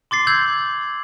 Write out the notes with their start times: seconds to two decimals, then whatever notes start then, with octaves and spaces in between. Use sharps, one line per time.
0.11 C6 D6 A6 C7
0.27 E6 G6 G#6 F#7